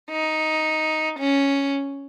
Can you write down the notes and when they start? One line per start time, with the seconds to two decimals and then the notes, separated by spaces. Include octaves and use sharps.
0.11 D#4
1.19 C#4